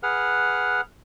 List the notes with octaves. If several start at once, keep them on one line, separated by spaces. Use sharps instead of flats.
G#4 B4 F#5 F6